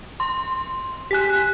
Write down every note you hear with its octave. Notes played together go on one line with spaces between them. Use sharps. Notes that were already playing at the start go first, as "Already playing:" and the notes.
C6
G4 G#5 F#6 B6